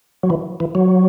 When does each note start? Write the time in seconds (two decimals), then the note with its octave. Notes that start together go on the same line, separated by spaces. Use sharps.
0.23 F#3
0.30 E3
0.60 E3
0.75 F#3